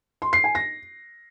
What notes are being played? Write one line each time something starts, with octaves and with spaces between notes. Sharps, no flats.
C6
C7
G#5
A#6